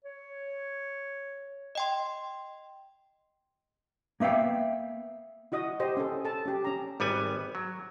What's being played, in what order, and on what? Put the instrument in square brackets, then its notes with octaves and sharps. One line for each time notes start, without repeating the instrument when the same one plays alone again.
[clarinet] C#5
[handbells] D#5 G5 C6
[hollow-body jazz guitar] A#3 B3 E5 F5 G5
[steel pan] E4 F#4 D#5 D#6
G4 C5 D#5
C#4 A4
A4 A5
C#4 G4
C#4 A#5
[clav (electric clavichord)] G#1 G3 B3 G#5
F#3